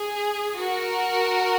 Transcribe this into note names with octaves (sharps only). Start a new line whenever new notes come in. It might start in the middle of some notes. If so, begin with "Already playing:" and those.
Already playing: G#4
F#4 A#4